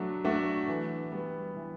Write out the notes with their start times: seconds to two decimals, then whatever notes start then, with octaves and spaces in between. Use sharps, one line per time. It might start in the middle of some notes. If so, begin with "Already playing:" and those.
Already playing: F#3 A3 D4 F#4
0.25 A3 D4 F#4
0.68 E3
1.12 G3 B3
1.56 E3